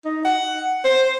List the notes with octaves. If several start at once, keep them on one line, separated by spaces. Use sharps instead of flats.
D#4
F#5
C5